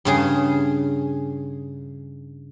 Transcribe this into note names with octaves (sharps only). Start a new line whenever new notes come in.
G2 C#3 G#4